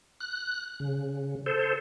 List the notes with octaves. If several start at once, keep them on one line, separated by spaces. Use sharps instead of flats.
F#6
C#3
A4 C5